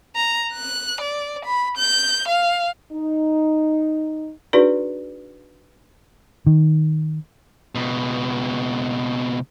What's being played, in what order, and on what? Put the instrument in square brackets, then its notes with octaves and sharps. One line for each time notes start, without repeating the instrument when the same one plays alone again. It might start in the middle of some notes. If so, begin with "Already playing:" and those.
[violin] A#5
F#6
D5
B5
G6
F5
[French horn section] D#4
[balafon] D4 D#4 F#4 G#4 B4 D5
[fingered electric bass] D#3
[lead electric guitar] C#2 B2